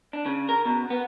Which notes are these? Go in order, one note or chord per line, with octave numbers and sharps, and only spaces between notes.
D4
C#3
A#4
B2
B3